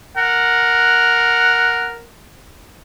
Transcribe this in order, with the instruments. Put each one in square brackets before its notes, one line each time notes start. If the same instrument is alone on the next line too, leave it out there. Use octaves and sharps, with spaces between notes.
[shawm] A#4 [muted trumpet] F#5